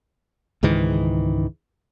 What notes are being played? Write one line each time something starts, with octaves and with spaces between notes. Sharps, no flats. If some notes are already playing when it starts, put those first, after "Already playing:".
C#2 G#2 D#3 E3